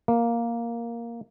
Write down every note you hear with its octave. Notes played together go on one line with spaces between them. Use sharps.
A#3